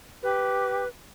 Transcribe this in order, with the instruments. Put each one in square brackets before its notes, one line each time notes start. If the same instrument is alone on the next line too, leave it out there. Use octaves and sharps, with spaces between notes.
[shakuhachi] G4 [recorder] B4